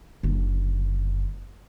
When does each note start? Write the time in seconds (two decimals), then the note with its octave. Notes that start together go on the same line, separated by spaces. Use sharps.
0.23 F#1 D3